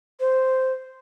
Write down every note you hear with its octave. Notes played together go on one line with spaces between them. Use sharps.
C5